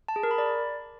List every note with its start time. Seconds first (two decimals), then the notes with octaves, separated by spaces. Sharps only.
0.08 A5
0.16 G#4
0.23 A#4
0.31 B5
0.38 D5